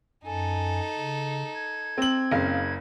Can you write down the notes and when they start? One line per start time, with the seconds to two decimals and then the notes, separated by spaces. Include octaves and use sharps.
0.25 F#2 D#4 A4 G#5
0.98 C#3
1.54 G#6
1.98 C4 F#7
2.31 F#1 C#3 F5